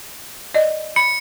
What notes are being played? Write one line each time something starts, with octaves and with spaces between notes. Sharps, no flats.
D5 D#5
B5 C#7